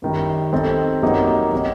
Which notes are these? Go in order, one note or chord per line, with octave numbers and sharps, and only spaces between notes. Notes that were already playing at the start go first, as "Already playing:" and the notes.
F#2 D#3 G3
G3 C4 D#4 A4
F#2 F#3 A#3 D#4 G4
F#3 C4 D#4